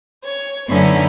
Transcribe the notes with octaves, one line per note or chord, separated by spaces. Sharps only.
C#5
F#2 D3 B3 C#4 D#4 E4